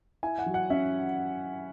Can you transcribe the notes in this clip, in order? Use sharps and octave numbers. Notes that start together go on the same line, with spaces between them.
E4 G#5
F#5
F#3
F#5
C#4 E5